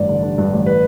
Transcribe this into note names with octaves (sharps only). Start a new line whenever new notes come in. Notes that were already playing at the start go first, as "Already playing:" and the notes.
Already playing: A1 G2 D5
D3
D3
G2
A1
B4